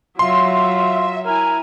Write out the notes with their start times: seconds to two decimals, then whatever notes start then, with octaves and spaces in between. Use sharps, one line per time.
0.19 F#3 F4 E5 C6
1.26 E4 A#4 G#5